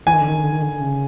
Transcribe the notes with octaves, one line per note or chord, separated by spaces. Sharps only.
E3 G#5
D#3
D3
D#3
D3
D#3
D3
C#3